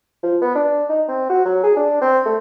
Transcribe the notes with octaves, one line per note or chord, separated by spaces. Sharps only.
F3
B3
D4
D#4
C4
F#4
F#3
G#4
D4
C4
A3